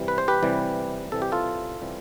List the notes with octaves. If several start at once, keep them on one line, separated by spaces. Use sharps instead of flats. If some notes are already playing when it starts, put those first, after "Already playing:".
Already playing: C3 E3 G3
B4
C5
G4 B4
C3 E3 G3
C3 E3 G3 A4
G4
F4 A4
C3 E3 G3